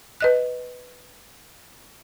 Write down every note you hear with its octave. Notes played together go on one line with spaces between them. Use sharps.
B4 D#5 F#6